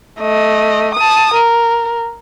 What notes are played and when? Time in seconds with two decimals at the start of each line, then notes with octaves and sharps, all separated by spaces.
0.21 A3 D#5
0.95 A5 D#6
1.34 A#4